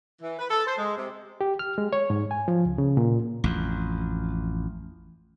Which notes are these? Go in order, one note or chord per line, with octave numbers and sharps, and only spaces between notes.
E3
B4
A4
C5
G#3
C3
G4
F6
G#3
C#5
G#2
G#5
F3
C#2
C#3
A#2
A1 F2